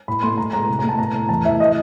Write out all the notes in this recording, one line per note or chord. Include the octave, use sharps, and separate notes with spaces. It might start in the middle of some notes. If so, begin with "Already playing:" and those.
A2 B5
A3 C6
A2 A#5
G#3 A#5
C3
A#5
A3
A5
A2 A#5
A3
E2 A5
E3 E5
D#5